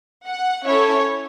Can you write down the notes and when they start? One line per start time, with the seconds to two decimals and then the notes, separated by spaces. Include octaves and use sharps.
0.26 F#5
0.65 C#4 E4 A4 C#5